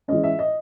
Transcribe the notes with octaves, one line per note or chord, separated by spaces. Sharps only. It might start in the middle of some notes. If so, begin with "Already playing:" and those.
E3 G#3 C#4 D#5
E5
D#5